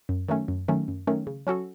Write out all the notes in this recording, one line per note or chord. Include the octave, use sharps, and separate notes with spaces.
F#2
D#3 F#3 A3 C#4
F#2
D#3 F#3 A3 C#4
F#2
D#3 F#3 A3 C#4
C#3
F#3 C#4 F#4 A4